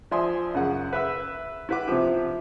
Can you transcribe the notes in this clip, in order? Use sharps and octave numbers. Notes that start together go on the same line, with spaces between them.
F3 D5 E5 G#5 C6 D#6
F#2 C#3 F#5
B4 E5 E6
E4 G4 B4 F#5 D6
C3 F3